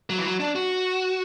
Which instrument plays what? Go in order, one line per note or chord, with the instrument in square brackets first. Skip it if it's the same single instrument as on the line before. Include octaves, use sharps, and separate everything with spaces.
[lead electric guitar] F#3
E3
F#3
D4
F#4